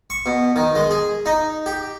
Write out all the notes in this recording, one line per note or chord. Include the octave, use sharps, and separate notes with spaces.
C#6
B2
D#3
G#3
G#4
D#4
G4